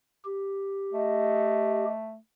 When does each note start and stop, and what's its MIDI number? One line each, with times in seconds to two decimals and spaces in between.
0.24 1.85 67
0.93 2.17 57
0.93 1.90 75